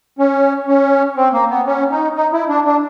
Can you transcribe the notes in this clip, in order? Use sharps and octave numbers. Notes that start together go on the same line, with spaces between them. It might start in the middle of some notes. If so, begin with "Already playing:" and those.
C#4
C#4
C4
A#3
B3
C#4
D#4
D#4
E4
D4
D4